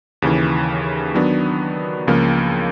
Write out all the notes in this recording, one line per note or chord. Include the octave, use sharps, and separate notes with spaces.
D#2 C#3 E3
D#3 F#3 B3 D4
C#2 C#3 F3 A#3